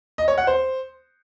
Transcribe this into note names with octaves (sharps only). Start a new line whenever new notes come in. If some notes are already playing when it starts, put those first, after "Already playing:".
D#5
C#5
F#5
C5